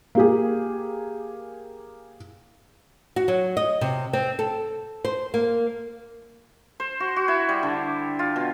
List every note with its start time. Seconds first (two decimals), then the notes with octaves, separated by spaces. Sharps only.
0.15 A#3 G4 G#4
3.16 F#4
3.28 F#3
3.57 D#5
3.81 C3
4.13 C4
4.39 A4
5.05 C5
5.34 A#3
6.80 C5
7.00 F#4
7.16 F#4
7.28 E4
7.49 G3
7.63 D3
8.19 F4
8.36 B2